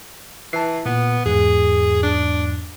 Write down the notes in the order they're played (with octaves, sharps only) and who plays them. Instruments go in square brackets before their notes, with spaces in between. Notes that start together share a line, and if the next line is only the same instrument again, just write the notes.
[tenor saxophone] E3 [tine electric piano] A5 C7
[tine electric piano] A#2 [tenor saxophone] B3
[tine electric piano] E2 G#2 [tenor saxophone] G#4
[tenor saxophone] D4